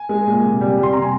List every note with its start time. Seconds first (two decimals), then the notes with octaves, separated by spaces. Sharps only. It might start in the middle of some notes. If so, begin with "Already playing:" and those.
Already playing: G#5
0.09 G#3
0.27 A#2
0.44 C3
0.61 G3
0.78 G3
0.83 C6
0.92 C3 A#5
1.02 G#5